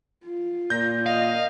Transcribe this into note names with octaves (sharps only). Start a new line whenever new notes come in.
F4
A#2 G6 A#6
D#5 F5